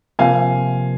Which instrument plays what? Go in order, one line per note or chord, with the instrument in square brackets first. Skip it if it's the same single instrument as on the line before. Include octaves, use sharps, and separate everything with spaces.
[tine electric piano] C3 F3 A#3 [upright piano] F5 G#5